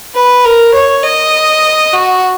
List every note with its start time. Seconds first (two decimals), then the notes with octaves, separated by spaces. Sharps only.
0.15 B4
0.45 A#4
0.74 C#5
1.03 D#5
1.93 F#4